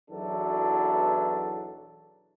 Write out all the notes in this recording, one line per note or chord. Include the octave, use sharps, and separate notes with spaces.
B1 E2 E3 F#3 D4 A4